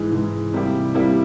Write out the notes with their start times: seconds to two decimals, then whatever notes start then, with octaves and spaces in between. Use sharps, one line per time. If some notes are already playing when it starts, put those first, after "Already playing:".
Already playing: G#2 E3 G#3
0.12 G#2 E3 G#3
0.53 C3 G3 A#3 E4 G4
0.95 C3 G3 A#3 E4 G4